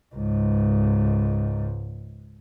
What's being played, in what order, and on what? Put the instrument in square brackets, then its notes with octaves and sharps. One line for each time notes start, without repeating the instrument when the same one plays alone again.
[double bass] C#2 G#2